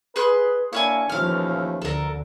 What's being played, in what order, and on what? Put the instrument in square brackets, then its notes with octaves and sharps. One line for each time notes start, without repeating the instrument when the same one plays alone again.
[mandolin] G#4 C6 F#6 [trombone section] B4
[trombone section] A#3 D4 E4 [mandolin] C#5 F5 G#5
[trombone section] D#2 A3 C#4 [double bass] E3 F3 [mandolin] F5 F6
[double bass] D2 D3 [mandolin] A4 A#4